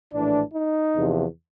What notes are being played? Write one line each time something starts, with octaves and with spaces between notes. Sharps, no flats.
A#1 A2 E3 D4
D#4
E2 C3 F3